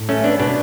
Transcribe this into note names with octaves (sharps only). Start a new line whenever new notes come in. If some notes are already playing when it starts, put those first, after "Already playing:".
Already playing: A2
A3 C#4
B3 D4
B2 B3 D4